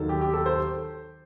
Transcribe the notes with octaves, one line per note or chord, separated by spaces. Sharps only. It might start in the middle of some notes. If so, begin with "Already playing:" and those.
Already playing: D#2 D#3 F#3 A4
G4
G4
A4
C5